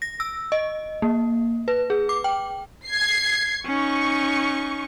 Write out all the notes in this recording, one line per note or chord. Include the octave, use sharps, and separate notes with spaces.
A#6
E6
D#5
A#3
B4
G#4
D6
G5
G#6 C7
C#4 D#4 C#6